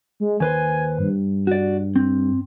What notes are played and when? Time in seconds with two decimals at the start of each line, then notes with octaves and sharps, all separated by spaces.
0.20 G#3
0.40 D#2 B4 C5 G#5
0.98 G2
1.47 F#4 D5
1.96 C4